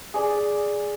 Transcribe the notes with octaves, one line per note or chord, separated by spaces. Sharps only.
G#4 D5